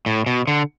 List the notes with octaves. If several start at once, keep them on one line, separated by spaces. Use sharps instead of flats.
A2
B2
D3